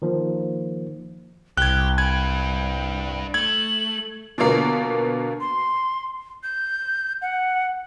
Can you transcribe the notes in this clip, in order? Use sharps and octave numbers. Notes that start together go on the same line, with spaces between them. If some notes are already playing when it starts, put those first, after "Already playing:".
D#3 F3 A#3
C2 G4 F#6 G#6 G7
D4 B4 G5 G#6
A3 G#6 F#7
B2 D3 F3 F#3 A#3 B3
C6
G6
F#5